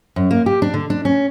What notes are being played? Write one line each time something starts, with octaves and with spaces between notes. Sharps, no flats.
F#2
A#3
G4
D4
D3
D4
C#4